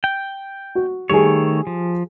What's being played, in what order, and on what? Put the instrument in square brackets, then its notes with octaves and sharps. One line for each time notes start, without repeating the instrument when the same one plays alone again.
[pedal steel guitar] G5
[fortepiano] F#4
[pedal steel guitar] D#3 A3 C#5 [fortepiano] G3 G#4
[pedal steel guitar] F3